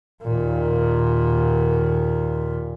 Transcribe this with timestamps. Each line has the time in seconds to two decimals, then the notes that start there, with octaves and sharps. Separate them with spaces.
0.24 D#2 A#2